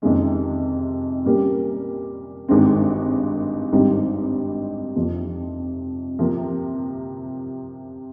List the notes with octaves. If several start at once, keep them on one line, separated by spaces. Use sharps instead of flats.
F2 C3 D#3 G#3 C#4
A#2 G3 C#4 G4 A#4
G#1 G2 D#3 G#3 C4
G#1 G2 G3 C4 D#4
F2 C3 F3
C3 F3 A#3